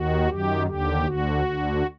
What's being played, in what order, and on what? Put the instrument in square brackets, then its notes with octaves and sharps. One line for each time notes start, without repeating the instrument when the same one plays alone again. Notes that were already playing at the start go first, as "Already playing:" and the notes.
Already playing: [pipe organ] D#2 D#3 F#4
F#2 D#3 G4
D#2 D3 G4
D2 D3 F#4
D2 D3